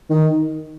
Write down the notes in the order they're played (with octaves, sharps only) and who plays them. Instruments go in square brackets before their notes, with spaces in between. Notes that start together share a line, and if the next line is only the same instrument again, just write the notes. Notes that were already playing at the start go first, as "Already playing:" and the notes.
[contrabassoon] D#3